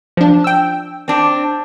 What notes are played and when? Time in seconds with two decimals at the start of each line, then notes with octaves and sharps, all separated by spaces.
0.17 F3 D4
0.44 G5 E6
1.08 C4 D4